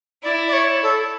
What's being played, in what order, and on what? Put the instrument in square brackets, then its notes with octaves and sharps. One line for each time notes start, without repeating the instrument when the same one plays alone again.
[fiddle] E4 [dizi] D5
[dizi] D5
C#5
A4